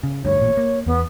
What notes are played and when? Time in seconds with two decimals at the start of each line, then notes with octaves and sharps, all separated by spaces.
0.03 C#3
0.25 D2 G2 C#5
0.38 A1 A#2
0.57 A#3
0.86 E2 B3